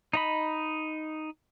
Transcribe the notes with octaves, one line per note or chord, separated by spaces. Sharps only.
D#4 D#5 B5